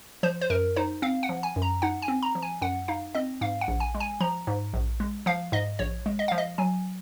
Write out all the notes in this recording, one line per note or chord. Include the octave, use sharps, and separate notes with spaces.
F3 C5
C5
F#2 A#4
D#4 C5
C4 F5
F#5
F3
G#5
F#2
A#5
D#4 F#5
G#5
C4
A#5
F3
G#5
F#2 F#5
D#4 F5
C4 D#5
G#2 F5
F#5
A#1
G#5
G#3
G#5
F3 A#5
G#2
A#1
G#3
F3 F5
G#2 D#5
A#1 C#5
G#3
D#5
F3 F5
D#5
F#3 G#5